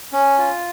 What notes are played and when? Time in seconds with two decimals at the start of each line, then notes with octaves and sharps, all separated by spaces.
0.13 C#4
0.38 F4